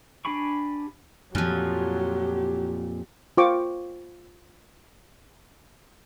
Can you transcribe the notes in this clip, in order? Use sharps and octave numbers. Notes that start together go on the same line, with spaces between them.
D4 G4 G#5 B5 C#6
F2 A#2 F3 F#3 G4
F4 C5 G5 C#6 D6